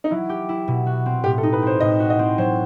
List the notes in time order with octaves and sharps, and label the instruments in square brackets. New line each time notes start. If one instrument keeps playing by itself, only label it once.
[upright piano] D#4
[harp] F#3 [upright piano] E4
[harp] G4
E4
B2
F#4
C4
[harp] A2 [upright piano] G4
[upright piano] A4
[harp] D#4
[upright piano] B4
[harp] C4 [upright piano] C5
[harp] A2 [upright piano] D#5
[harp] F#4
[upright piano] D#5
[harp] C4
[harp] F#3 [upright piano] C5